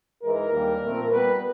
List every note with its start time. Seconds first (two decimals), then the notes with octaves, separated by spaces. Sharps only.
0.24 G#2 E3 G#3 A#4
0.52 D#2 D3 G3 A#3
0.82 A#2 F3 A3 C4
1.11 A#2 G3 B3 B4